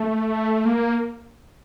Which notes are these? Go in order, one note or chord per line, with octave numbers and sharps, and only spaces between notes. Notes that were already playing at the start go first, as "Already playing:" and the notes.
Already playing: A3
A#3